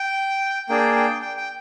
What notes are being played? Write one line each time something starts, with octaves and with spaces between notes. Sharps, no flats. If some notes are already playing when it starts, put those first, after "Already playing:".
Already playing: G5
A#3 D4 G#4 G5
G5
G5
G5